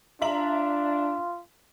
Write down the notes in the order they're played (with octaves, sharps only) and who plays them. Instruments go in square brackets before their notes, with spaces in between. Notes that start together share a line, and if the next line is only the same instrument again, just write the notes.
[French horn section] D4 [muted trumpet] F4 [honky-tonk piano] E5 A#5 F#7